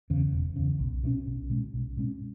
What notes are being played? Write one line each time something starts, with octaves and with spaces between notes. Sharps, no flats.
E2 C#3
E1
E2 C#3
B1
B2 G#3 C#4
B1
B2 G#3 C#4
B1
B2 G#3 C#4